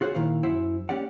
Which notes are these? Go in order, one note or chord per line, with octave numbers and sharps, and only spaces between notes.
F4 F#4 G#4 C5 C#5
A#2 D#3 E4 F5
F#2 E4 C5 E5 F#5
A#3 C#4 G4 D5 F#5